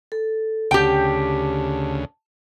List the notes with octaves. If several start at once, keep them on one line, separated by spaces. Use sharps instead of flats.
A4
D2 C#3 G4 G5 A5